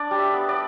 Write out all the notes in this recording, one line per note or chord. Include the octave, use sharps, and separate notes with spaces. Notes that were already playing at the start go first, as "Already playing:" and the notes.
Already playing: D4 D5
G3
E5
B3
D5